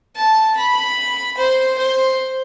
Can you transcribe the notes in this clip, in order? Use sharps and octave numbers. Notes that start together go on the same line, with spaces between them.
A5
B5
C5
C5